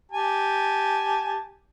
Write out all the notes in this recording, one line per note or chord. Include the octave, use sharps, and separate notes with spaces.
G4 G#5 A5